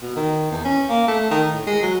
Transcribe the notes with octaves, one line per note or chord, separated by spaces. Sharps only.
B2
D#3
E2
C#4
A#3
A3
D#3
A2
G#3
F#3